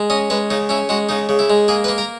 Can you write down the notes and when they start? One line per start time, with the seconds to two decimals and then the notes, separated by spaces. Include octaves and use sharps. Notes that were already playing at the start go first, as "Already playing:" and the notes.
Already playing: G#3
0.10 C#4 D#5
0.30 G#3 B4
0.51 C#3 D#4
0.69 C#4 E4
0.89 G#3 F#4
1.09 C#3 D#4
1.29 C#3
1.39 E4
1.50 G#3
1.68 A#3 G#4
1.84 B4
1.88 A#3
1.98 A#4